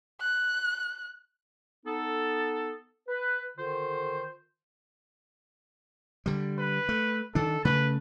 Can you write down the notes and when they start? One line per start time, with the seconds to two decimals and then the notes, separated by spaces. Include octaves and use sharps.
0.21 F#6
1.85 B3 D#4 A4
3.08 B4
3.57 D3 D#3 F4 C5
6.26 D3 G3
6.59 B4
6.89 A3
7.35 D#3 D4 A4
7.65 C#3 A3 B4